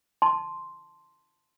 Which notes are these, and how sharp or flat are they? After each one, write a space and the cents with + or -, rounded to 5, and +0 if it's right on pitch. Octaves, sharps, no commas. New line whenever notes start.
A5 +0 C6 +0